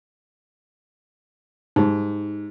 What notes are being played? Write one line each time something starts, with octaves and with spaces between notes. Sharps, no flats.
G#2 D#4 G4